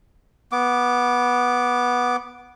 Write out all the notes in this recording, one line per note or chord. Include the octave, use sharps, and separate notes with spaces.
B3 D6